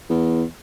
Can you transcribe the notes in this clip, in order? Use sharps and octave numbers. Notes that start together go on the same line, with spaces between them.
E2